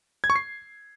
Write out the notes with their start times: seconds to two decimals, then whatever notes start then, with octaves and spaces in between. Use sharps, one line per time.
0.24 G#6
0.30 C#6
0.36 C7